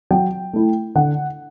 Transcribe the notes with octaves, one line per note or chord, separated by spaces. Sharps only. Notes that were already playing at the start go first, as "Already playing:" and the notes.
F#3 G5
A3 E4
D3 F#5